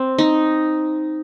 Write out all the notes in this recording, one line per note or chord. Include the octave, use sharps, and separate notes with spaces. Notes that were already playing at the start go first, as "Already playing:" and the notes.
Already playing: C4
D#4